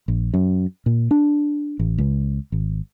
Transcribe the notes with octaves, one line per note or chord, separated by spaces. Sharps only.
A#1
F#2
A#2
D4
A1
C#2
G#1